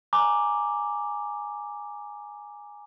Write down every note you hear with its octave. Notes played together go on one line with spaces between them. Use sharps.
G#5 A#5 D6